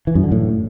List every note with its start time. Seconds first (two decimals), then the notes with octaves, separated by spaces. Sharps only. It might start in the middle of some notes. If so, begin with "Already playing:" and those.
0.07 E3
0.15 F#2
0.23 D3
0.32 A2